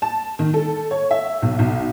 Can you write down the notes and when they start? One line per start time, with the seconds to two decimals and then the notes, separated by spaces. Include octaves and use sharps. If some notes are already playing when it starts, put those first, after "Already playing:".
0.02 A5
0.39 D#3
0.54 A4
0.91 C#5
1.11 E5
1.42 B1
1.59 B1